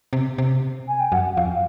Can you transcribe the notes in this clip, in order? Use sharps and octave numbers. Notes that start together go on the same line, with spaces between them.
C3
C3
G#5
G5
F#2 F#5
F2 F5